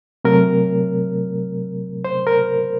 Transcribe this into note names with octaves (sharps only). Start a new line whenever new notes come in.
C3 F#3 A3 C4 A#4
C5
A#4